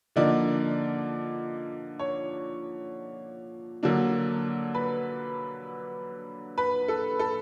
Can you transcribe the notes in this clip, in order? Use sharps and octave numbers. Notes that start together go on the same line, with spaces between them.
D3 F3 A#3 D#4 D5
C#5
D3 F#3 A#3 D4
B4
B4
A4
A4